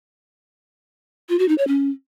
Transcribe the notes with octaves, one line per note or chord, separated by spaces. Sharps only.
F4
F#4
D#4
C#5
C#4